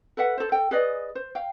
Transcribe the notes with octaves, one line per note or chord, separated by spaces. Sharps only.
A4 B4 E5 F#5
A4 C5
A4 G5
G#4 B4 D5 D#5
C5
F5 G5